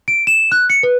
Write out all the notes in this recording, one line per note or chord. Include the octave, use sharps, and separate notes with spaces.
D7
E7
F#6
C#7
B4